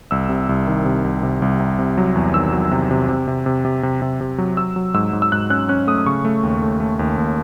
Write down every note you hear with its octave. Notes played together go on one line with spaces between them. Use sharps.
C2 E6
C3
C2
D#3
C3
C2
C3
C2
C3
C3
F#3
E2
D#3 E6
F#3
C3
C3
C3
C3
C3
C3
C3
C3
C3
F#3
F#3 E6
F#3
G#2 E6
G#2
E6
G#2 F#6
C#4 F#6
C#4 F#6
A3 D#6
D#6
C#3 C#6
A3
D#2
A3
A3
D#2
D#2